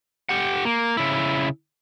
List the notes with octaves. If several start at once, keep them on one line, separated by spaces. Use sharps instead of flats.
G4 F#5
A#3
C#3 E4